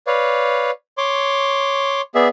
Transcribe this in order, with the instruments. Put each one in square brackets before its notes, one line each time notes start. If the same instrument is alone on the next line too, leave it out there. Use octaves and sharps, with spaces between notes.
[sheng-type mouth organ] B4 C#5 D5 F5
C#5 C6 D6
B3 G#4 D5 E5